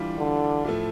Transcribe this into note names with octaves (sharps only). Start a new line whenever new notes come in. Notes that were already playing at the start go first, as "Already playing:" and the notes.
Already playing: E3 G3 D4 F4
D3
A2 F3 A3